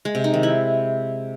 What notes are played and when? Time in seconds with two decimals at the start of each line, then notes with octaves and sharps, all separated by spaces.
0.05 G#3
0.15 C3
0.24 D#4
0.34 D#3
0.43 E4